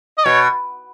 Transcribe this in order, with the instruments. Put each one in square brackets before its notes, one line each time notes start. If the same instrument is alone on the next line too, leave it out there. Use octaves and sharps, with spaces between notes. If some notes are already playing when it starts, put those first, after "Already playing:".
[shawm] D#5
[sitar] B2 [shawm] C#5